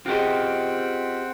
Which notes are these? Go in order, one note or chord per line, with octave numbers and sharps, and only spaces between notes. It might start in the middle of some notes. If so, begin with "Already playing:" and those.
C4 C#4 F4 G4 G#4 D#5 F#5 G5